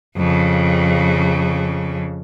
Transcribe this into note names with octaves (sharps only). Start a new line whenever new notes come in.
F2 C#3